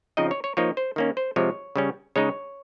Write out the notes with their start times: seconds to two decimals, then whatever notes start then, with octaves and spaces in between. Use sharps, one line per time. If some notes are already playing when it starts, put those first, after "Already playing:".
0.17 C#3 F3 C4 D#4 D#5
0.31 C#5
0.44 C#5
0.57 F3 A#3 D#4 C#5
0.77 C5
0.96 D#3 A#3 C#4
1.17 C5
1.36 C3 F3 G#3 C#5
1.76 C#3 G3 C#4
2.16 C#3 G#3 D#4 C#5